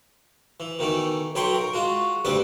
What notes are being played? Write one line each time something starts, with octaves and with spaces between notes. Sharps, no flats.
E3
B2 D#3 E3 A3
B1 F#3 C#5 G5 B5 C6
A#4
G#3 F4 F#4
D2 G2 G3 C4 B4 D5